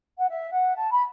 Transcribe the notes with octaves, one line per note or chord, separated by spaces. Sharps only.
F#5
E5
F#5
A5
B5